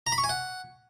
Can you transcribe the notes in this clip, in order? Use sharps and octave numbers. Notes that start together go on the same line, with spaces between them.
A#5
B5
C#6
G#5
F#5